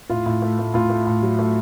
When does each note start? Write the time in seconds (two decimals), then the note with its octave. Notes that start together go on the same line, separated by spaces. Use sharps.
0.10 A2 F4
0.26 A2
0.42 A3
0.59 A3
0.74 A2 F4
0.90 A3
1.07 A2
1.22 F#3
1.39 A3